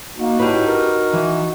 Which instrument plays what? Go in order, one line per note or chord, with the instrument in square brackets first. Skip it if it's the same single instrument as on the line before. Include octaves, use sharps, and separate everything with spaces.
[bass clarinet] A#3 [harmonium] D#4 F#4
[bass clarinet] A2 [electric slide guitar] G4 B4
[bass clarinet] A#4
[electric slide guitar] E3